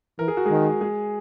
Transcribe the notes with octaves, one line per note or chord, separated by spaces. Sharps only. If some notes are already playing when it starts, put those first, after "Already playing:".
E3 A#4
G#4
F#4
D#3 G#3 G#4
G#3 G#4